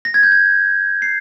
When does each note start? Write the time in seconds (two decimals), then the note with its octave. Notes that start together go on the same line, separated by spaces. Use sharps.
0.05 A#6
0.14 G#6
0.23 G6
0.32 G#6
1.02 C7